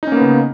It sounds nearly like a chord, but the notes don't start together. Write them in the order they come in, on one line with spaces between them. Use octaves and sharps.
D#4 C#4 A#3 B3 C#3